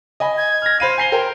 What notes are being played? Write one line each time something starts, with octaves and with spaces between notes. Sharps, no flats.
D#5 G#5 B5
G#6
F6 A#6
C5 F5 B5 D#7
G#5 A#5 C7 G7
A#4 C5 G5